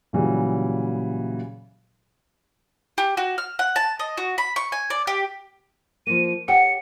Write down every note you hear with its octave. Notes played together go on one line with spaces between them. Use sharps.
A#2 C#3 E3 F#3 G3
G4
F#4
F6
F#5
A5
D#5
F#4
B5
C#6
G#5
D5
G4
F3 A#3 D#7
G4 C#5 F#5 G5 C#7